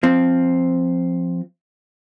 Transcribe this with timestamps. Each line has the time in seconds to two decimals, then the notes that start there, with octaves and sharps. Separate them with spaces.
0.03 F3 C4